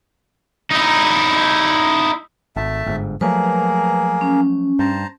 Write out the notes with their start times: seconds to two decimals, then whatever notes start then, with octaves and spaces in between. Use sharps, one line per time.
0.71 D#4 E4
2.56 G#1 A3 E5 A5
2.86 G1 G#2
3.21 F3 F#3 A3 A#3 G#4 A#4 B4
4.21 C#4
4.79 G2 C5 A5 A#5